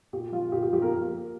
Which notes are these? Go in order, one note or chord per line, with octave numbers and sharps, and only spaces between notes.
A#2 G4
F3 F4
A#2 G4
G4
F3 G4
A#3 A#4